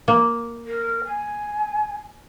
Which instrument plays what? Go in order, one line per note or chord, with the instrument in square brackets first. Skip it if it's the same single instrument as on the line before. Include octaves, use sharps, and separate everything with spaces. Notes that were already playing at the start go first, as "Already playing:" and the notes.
[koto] A#3
[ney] A#4
G#5